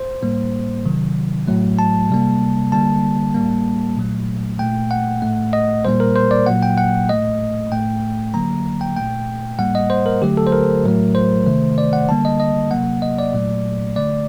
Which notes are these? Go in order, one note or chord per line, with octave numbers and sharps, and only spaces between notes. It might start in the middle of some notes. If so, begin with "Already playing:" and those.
Already playing: C5
A2 G3 A#3
C3 D#3 F#3
A2 F#3 A3
A5
C3 G3 A#3
D3 G3 A#3 A5
A2 G3 A#3
A#2 F#3 A3
A#2 A3 G5
F#5
A2 A3
D#5
A#2 G3 A#3 C5
A#4
C5
D5
A#2 F#3 A#3 F#5
G5
F#5
A2 A3 D#5
A2 A3 G5
D3 F#3 A#3 A#5
G5
A#2 A3 G5
A2 G3 A#3 F#5
D#5
C5
A#4
D3 F#3 A3 G4
A4
C5
A#4
A2 F#3 A3
C5
C3 D#3 A3
D5
F#5
D3 G3 A#3 A5
D#5
D#5
C3 F#3 A#3 F#5
D#5
D5
A#2 F#3 A3
D3 A3 D5